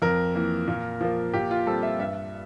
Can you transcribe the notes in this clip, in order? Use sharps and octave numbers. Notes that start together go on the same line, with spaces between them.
F2 A#4
E3 A#3
A#2
F3 A#3
A#2 G4
F4
G3 C4 A4
E5
G2 E5